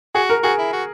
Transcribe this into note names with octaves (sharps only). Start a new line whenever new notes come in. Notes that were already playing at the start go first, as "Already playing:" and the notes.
F#4 G#4
A#4
F#4 G#4
E4
F#4